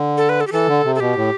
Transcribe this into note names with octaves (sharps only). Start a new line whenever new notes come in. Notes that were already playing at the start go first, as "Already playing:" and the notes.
Already playing: D3
A4
B4
A4
G4
E3 A4
D3
C3
A4
B2 G4
A2